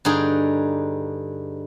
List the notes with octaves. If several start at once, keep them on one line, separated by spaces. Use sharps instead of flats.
G2 D3 D#4 G#4